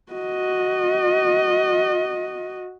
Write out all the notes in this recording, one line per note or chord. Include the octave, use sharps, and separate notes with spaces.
F#4 D#5